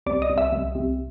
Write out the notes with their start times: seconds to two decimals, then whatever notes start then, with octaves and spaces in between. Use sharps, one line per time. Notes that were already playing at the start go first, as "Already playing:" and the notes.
0.06 C2 D5
0.22 D#5
0.30 C2
0.38 E5
0.52 C2
0.75 C2